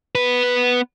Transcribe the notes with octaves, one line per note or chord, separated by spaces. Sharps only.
B3 B4